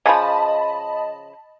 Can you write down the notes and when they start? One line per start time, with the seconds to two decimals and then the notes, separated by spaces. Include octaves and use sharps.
0.06 C#3 F3 D#5 A5 B5